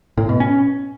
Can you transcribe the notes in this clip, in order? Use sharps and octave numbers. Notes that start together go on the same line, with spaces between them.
A2
B2
C#4